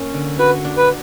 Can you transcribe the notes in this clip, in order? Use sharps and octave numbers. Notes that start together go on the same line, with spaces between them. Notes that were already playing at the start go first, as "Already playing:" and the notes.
Already playing: A#3 C#4
D3
F#4 B4
D4
B4